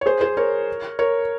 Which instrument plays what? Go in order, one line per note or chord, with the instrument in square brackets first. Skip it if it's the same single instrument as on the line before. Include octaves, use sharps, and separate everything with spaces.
[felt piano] C#5
G#4 C5
G#4 C5
A#4 C#5
A#4 C#5